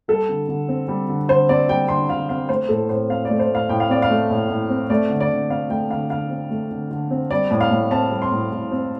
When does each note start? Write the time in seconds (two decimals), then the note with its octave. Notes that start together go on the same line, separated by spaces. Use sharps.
0.08 G3 A4
0.29 D3
0.49 D3
0.68 C4
0.88 G3
1.09 D3
1.29 D3 C5
1.49 C4 D5
1.69 G3 G5
1.88 D3 C6
2.09 D3 F5
2.29 C4 F5
2.49 A3 C5
2.69 A2 A4
2.89 A2 C5
3.09 C4 F5
3.25 A3 D5
3.39 C5
3.50 A2
3.55 F5
3.69 A2 G5
3.80 F5
3.90 C4 D5
4.02 F5
4.10 A3
4.30 A2
4.50 A2
4.70 C4
4.90 A3 D5
5.09 D3
5.20 D5
5.30 D3
5.50 C4 F5
5.70 A3 G5
5.90 D3 F5
6.10 D3 F5
6.30 C4
6.50 A3
6.71 D3
6.91 D3
7.11 C4
7.31 G3 D5
7.51 A2
7.61 F5
7.70 A2
7.91 C4 A5
8.11 G3
8.22 C6
8.31 A2
8.51 A2
8.71 C4